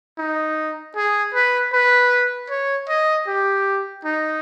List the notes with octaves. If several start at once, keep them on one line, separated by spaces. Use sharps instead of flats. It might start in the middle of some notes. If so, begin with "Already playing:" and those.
D#4
G#4
B4
B4
C#5
D#5
G4
D#4